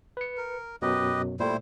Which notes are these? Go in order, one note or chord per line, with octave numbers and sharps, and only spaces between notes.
B4 C#7
A#4
F#2 B2 F#3 G4 B4 D#5
A#2 G3 A3 E4 C5